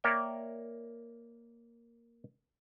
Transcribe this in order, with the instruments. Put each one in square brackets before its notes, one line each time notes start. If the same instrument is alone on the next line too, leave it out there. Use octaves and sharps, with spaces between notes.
[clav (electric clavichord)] A#3 A#4 C#5 D5 E5 G5